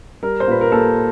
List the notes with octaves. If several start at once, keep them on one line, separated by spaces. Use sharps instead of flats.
G3 A#4
C5
A#2 B4
A#4
A#3 A4